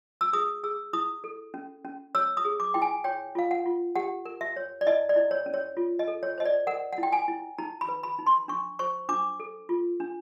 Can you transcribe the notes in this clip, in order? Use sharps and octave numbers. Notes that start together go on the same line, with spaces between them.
E6
G#4 D#6
G#4 E6
E4 D#6
A4
C#4
C#4
C#5 E6
D#6
G#4
D6
E4 G5
G#5
C#5 G5
F4 F5
F#5
F4
G4 F#5
A#4
E5
C#5
D5
E4 D#5
D5
E4
C#5
C#4
C#5
F4
D#5
A4
C#5
C5 D#5
D5
A#4 F#5
F#5
E4 G5
G#5
E4
D#4 A#5
B5
B4
B5
D#4
C6
D4 C#6
C5 C#6
D4 D6
A4
F4
D4